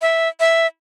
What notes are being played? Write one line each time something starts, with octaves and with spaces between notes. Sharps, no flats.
E5
E5